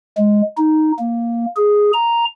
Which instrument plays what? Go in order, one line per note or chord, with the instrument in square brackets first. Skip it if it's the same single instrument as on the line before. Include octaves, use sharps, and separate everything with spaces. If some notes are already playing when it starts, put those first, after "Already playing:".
[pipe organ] G#3
D#4
A#3
G#4
A#5